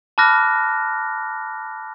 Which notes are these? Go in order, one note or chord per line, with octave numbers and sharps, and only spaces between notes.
A5 B5 D6 F6 F#6 A#6